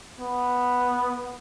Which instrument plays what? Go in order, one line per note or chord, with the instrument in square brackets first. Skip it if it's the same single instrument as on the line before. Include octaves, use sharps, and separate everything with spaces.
[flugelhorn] B3